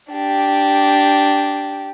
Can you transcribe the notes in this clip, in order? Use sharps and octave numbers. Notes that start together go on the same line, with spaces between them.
D4 G4